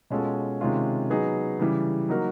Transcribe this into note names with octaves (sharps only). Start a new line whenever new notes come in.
B2 G#3 C#4 F4 A4
C3 D#3 G#3 C#4 F4
F#3 B3 D#4 G#4
C#3 E3 G3
F#3 A#3 D#4 F#4 A#4